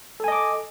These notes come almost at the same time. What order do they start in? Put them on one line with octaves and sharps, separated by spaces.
A4 G#5 D#5 D6